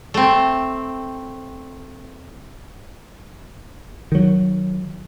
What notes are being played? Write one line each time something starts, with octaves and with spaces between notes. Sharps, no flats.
A3 C4
D#3 F#3